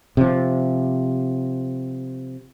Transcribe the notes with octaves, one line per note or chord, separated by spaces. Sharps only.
C3 F3